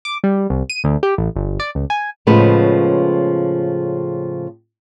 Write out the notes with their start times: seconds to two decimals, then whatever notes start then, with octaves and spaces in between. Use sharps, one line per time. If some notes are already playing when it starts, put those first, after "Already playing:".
0.05 D6
0.24 G3
0.50 C2
0.70 D#7
0.84 D2
1.03 G4
1.18 A1
1.36 G1
1.60 D5
1.75 C#2
1.90 G#5
2.27 A2 C#3 F3 G#3 B3 B4